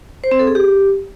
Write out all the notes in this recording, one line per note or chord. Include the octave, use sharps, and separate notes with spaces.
C5
C4
A4
G#4
G4